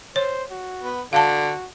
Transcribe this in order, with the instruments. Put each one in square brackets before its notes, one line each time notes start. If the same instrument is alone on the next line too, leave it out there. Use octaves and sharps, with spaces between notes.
[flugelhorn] C5 [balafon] C#5
[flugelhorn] F#4
[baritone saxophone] B3
[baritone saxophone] D3 [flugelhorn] F#4 [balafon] F5 A5